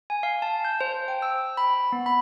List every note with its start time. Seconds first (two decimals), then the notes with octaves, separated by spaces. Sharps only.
0.10 G#5
0.23 F5
0.42 A5
0.65 G6
0.81 C5
1.08 G5
1.22 E6
1.57 B5
1.92 B3
2.06 B5